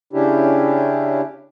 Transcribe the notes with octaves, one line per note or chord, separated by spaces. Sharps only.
C#3 C#4 D4 E4 G4